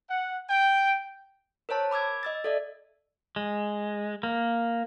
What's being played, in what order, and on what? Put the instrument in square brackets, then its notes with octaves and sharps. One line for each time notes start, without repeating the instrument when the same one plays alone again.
[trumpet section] F#5
G5
[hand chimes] A#4 C5 C#5 A5
B5 D6 E6 G#6
D#5 E6 A6
A4 D5 E5
[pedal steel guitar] G#3
A#3